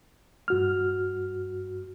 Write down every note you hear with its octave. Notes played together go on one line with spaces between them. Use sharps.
G2 F#4 F6